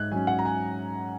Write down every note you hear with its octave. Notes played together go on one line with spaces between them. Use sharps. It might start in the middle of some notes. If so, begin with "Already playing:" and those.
Already playing: G#2 F#6 G#6
F#3 C#4 G#5
F#5
A#5
G#5